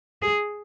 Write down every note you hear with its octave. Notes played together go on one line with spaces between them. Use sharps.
G#4